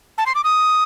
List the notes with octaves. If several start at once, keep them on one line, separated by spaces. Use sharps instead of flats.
A5
C6
D6
D#6